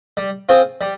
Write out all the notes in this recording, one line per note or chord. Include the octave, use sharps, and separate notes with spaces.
G3
C4 F4 G#4 C5
G3